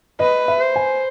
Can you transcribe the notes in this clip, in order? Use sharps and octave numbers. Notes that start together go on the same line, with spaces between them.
B4 D#5
E5
C5
G#5